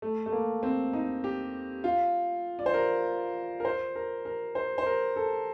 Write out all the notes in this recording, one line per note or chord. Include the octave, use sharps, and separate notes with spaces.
A3
A3
A#3
C4
D#4
G4
F4
D5
C5
A#4
A#4
C5
A#4
A#4
C5
C5
A#4
A4